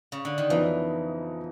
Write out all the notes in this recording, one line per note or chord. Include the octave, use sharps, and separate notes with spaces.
C#3
D3
D#3
F2 C#3 E3 F#3 B3 D#4